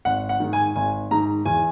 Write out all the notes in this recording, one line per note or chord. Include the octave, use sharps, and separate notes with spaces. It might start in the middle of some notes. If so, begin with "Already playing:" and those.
G#1 F#5
F#5
G#2 D#3
G#5
G#1 G#5
G#2 D#3 A#5
E2 G#5